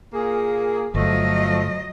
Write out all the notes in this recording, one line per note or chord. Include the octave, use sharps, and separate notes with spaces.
A#2 A#3 G#4
G1 F3 F#3 A3 D#5